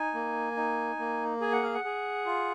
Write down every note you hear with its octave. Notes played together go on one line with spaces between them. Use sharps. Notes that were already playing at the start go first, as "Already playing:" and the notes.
Already playing: D#4 G#5
A#3
D#4
A#3
G#4 G#5
F#5
F5
F#5
G#4
F4